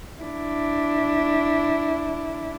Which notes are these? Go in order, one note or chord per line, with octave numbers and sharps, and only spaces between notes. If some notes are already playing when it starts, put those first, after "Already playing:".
D4 E4